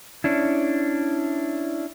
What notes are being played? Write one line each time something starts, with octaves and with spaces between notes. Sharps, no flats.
C#4 D4 E4